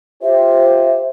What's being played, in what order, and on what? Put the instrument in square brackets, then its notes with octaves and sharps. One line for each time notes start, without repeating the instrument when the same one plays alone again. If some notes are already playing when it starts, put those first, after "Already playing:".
[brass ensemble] F4 G4 C5 [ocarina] E5